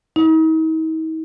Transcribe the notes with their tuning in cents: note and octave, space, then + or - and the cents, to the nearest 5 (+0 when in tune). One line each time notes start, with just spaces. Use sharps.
D#4 +45